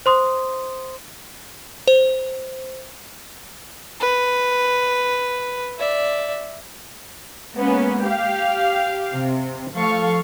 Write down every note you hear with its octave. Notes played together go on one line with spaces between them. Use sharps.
C5 C6 D#6
C5
B4
D5 E5
G#3 A#3 B3 C#4
G4 F5
C3
F3 A3 A4 F5 C#6